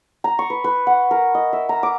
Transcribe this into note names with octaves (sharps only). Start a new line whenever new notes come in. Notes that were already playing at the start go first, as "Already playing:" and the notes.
A#5
C#6
B4
B4
F#5
A#4
D#5
E5
A#5
D6